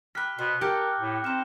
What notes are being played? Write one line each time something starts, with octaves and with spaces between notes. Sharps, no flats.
G4 B5 F6 F#6 B6
B2 C5
G4 A#4 F#5 G5 A5 G6 A#6 C#7
A2
C4 D#4 E4 F6 E7